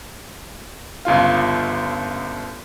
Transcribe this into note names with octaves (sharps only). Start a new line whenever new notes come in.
G1 C#2 F4 F5